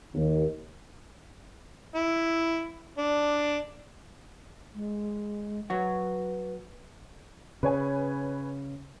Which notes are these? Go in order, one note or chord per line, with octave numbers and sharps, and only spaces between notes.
D#2
E4
D4
G#3
F#3 F#4 B4
C#3 B4 C#5 G#5